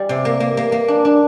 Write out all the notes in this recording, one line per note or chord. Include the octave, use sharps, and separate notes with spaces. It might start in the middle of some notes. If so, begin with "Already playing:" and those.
Already playing: G3
C3
A#3
A#3
A#3
A#3
D4
D4